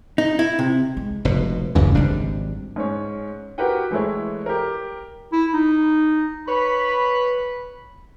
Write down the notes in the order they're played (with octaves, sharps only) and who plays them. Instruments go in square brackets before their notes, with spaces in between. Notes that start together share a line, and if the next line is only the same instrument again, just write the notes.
[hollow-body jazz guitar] D#4
E4
C3
[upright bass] G#3
[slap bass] F1 B2
[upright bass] F1 C#2 [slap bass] F#2 C#3 E3
[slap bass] G#1 G3 D4 [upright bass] F#3 F4
[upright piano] G#2 C#4 C#5
F#4 G4 A#4 B4 F#5 G5
E3 G#3 A3 E4 C#5
G4 A#4
[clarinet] E4
D#4
[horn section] B4 C#5 B5